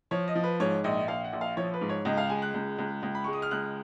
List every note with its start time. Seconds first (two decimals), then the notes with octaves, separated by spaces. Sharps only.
0.11 F3 C#5
0.28 D#5
0.35 F3
0.44 B4
0.60 G#2 C#5
0.84 A#1 D#5
1.08 A#1 F5
1.24 F#5
1.33 A#1
1.41 F5
1.57 F3 C#5
1.74 B4
1.81 G#2
1.89 C#5
2.05 C#2 D#5
2.17 F5
2.30 G#3 G#5
2.42 F#6
2.54 C#2
2.78 C#2
3.03 C#2
3.15 B5
3.24 G#3 C#6
3.33 D#6
3.42 F6
3.51 C#2 F#6